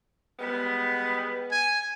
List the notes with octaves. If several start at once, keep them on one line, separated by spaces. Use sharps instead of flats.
G3 G#3 B3
G#5